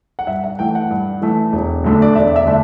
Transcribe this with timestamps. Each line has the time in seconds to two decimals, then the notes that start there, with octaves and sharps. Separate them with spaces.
0.19 F#5
0.27 G2 E5
0.44 F#5
0.59 E3 A3 G5
0.75 F#5
0.90 G2
1.22 E3 A3
1.53 E1
1.84 D2 D3 A3 D4
2.02 D5
2.15 E1 E5
2.36 E5
2.47 D3 A3 D4